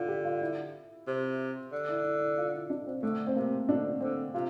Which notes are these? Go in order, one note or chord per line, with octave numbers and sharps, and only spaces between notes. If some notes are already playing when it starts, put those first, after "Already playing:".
Already playing: D3 E4 F4
G4
F4
E4
C3
D3
E4
E4
E4
F4
E4
D4
C4
D3 A3
C4
C3 A#3
D3 D4
D3 C4
C3 F4